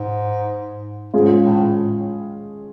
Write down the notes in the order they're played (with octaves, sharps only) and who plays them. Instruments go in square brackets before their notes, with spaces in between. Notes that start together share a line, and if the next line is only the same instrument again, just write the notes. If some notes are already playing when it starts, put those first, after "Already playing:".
Already playing: [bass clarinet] G#2
[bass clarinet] G#2 [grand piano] G#3 C#4 F4 G#4
[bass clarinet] A2